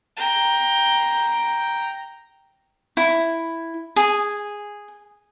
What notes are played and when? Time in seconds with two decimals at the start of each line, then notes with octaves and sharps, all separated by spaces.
0.17 G5 A#5
2.97 E4
3.96 G#4